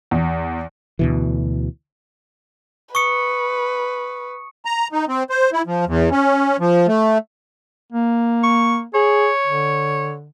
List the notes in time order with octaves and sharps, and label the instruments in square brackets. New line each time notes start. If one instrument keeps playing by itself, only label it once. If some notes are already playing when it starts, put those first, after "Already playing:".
[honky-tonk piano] E2
[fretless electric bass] D2 B2 E3
[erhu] B4 [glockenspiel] C#6 D#6 C#7
[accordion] A#5
D#4
C4
C5
E4
F3
E2
C#4
F3
A3
[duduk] A#3
[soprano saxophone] C#6
[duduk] G#4 [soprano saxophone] C#5
[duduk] D3